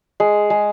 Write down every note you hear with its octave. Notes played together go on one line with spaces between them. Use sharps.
G#3
G#3